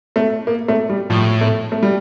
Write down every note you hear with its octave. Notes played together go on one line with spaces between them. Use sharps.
A3
A#3
A3
G3
A2 F3
A3
A3
G3